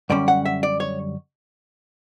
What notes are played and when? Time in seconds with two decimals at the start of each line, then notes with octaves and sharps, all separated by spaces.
0.10 F#2 D3 G3 C#4 D5
0.28 F#5
0.46 E5
0.63 D5
0.80 C#5